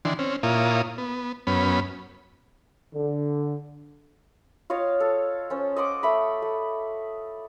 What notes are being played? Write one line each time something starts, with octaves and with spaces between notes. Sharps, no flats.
D#3 E3 D4 C6
C4 C#4
A#2 E4 F4 A#4 C#5 D#6
B3
F#2 B3 C#4 B5
D3
F4 C#5 D#5 F5
A4
C#4 C5
D#5 F#5 C6 D6
A3 B5
A3